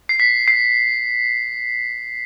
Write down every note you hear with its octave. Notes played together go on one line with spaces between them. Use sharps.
C7
B6
C7